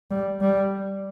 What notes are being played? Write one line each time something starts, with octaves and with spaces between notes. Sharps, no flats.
G3
G3